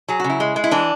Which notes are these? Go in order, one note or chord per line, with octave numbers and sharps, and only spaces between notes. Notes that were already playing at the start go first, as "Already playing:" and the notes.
F#3 G#4
F#4
C#3
E4
G#3
G#3
E4
E3 D4